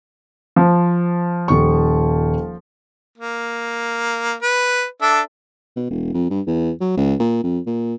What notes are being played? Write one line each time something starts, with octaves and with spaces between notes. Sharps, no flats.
F3
D#1 C#6
A#3
B4
D4 A4 E5
B2
E1
F2
G2
E2
F#3
C#2
A#2
F2
A#2